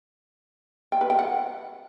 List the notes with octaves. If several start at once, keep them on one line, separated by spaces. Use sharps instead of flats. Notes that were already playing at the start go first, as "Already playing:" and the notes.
G5
B4
G5
F#5